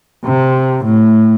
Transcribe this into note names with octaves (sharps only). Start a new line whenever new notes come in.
C3
A2